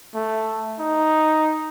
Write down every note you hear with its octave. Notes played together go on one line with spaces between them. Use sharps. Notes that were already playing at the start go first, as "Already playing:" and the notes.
A3
D#4